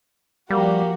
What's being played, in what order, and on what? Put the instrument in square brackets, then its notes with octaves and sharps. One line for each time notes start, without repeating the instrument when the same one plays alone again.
[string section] F3 F#4 [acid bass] G3 [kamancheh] A#3 G4